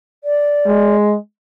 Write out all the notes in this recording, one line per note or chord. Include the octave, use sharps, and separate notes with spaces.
D5
G#3